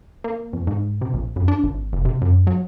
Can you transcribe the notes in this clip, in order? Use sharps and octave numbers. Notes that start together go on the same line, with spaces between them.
A#3
F2
G#2
C3
A#1
F#2
D4
G#1
F#1
C3
F#2
F#3